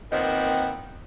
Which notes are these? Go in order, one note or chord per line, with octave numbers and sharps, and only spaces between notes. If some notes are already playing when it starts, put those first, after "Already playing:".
A#2 D#3 B3 C4